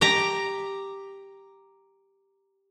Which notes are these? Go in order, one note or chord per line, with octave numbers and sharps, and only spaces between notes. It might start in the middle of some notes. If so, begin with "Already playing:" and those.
G4 A#5